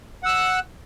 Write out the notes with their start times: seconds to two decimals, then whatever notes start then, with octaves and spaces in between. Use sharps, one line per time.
0.23 F#5
0.26 E6
0.28 F#6